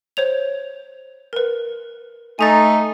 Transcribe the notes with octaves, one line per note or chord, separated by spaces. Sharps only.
C5 C#5 F7
A#4 B4
A3 D#4 G#5 A#5 A6